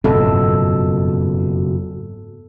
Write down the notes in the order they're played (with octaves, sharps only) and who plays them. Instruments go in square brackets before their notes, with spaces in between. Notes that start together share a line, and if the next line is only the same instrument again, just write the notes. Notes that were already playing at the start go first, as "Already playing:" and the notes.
[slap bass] F#1 F2 [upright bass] G#2 [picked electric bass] B2 [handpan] A4